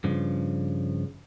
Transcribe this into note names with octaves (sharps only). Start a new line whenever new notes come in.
G2 C#3 F3